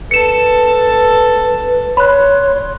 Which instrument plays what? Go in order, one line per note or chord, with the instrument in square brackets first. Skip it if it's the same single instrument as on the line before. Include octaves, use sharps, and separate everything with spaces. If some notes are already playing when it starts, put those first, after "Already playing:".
[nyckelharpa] A4 A5 [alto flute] B4 [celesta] C#7 E7
[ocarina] C#5 [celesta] B5 F#6 [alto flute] C6